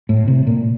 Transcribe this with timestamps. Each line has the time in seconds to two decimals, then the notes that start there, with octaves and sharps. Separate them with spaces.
0.09 A2
0.28 C3
0.47 A#2